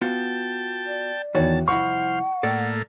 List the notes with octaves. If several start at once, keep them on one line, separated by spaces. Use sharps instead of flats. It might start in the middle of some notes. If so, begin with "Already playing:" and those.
B3 F4 F#4 G5 A5
D5
E2 D#3 E3 F#4 C#5 A5
C2 F2 E4 C5 F#5 C#6 F6
A2 A3 A#3 A4 D5